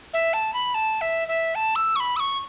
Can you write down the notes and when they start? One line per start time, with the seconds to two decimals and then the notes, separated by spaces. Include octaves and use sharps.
0.14 E5
0.33 A5
0.54 B5
0.74 A5
1.01 E5
1.28 E5
1.55 A5
1.76 E6
1.96 C#6
2.00 B5
2.16 E6
2.20 C#6